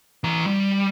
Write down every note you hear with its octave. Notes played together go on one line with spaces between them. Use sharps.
E3 A#5
G3